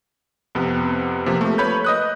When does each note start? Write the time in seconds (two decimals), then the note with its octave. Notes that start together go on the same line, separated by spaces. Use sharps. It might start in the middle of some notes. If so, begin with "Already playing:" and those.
0.55 F2 C3 B3
1.26 C3 F3 A#3
1.41 A3
1.58 B4 C#5 B5 C#6 G6
1.85 D#5 D#6 F#6